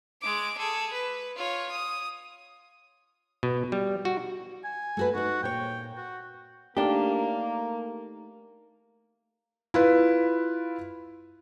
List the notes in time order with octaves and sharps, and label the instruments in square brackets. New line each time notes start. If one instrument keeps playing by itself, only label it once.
[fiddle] G#3 D6
G#4 A4
B4
F4 C#5
D#6
[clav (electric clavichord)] B2
G3
F#4
[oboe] G#5
[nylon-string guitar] A3 F#4 B4
[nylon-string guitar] D#4 B4 [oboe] F#4
[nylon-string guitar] A#2 C#5 [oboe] G5
[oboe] F#4
[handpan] A3 D#4 A#4 [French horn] A#3 [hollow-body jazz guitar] D4 G4
[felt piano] E4 F4 B4